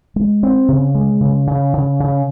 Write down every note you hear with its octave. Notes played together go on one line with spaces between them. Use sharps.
G#3
C4
C#3
G#3
C#3
C#3
C#3
C#3